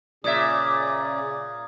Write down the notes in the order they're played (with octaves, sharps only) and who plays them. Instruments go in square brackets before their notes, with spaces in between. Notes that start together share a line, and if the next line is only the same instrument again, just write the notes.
[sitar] A#2 E5 [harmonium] C#3 C#4 G#4 [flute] D5 [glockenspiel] D#6 G#6